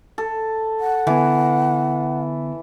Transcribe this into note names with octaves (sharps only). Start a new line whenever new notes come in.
A4
F#5
D3 E3 B3